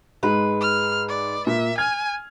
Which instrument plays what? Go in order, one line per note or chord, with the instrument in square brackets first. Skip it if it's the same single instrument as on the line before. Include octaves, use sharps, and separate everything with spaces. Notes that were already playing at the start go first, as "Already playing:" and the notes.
[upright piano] G#2 G#3 [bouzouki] B4
[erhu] F6
D5
[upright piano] A#2 [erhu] E5
[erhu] G#5 [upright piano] F6 G#6